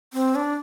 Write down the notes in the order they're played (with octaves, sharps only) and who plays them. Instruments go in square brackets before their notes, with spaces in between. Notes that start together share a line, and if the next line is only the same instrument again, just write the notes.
[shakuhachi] C4
D4